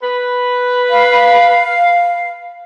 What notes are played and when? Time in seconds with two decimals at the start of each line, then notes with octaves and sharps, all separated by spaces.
0.02 B4
0.89 F5